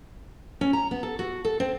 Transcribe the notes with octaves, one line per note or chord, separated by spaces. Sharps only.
C#4
A#5
B3
A4
F#4
A4
C4